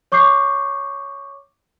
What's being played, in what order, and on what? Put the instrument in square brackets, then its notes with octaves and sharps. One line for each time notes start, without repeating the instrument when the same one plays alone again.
[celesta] C#5 C#6 D6 G6 C7